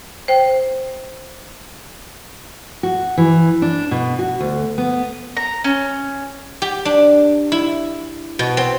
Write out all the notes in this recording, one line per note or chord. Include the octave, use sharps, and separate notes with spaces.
C5 G5
F#4
E3
D4
B2
F#4
D2
B3
A#5
C#4
G4
D4
E4
B2
C4